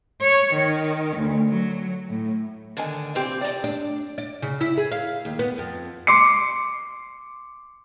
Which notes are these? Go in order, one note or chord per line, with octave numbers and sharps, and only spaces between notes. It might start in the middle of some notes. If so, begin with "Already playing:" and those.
C#5
D#3
D2
F#3
A2
D3 D#3 G#5
A#2 E3 C4 G4
D#4 D5
D4
D5
C#3
E4
G#4
F5
D#2
B3
F2
C6 D6 C7 C#7